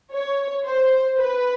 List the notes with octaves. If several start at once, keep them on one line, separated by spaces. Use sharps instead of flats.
C#5
C5
B4